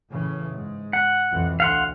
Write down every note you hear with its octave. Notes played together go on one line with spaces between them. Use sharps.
A2 C#3 E3
G#2
F#5
B1 F2 E3
D2 F5 F#5 C6